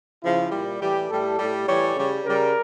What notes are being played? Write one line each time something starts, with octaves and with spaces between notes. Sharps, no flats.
C#3 F3 E4
A#2 G3
A2 E3 G3 G4
A2 G3 A4
A2 G3
A2 E3 G3 C#5
C#3 G3
C#3 G3 A#4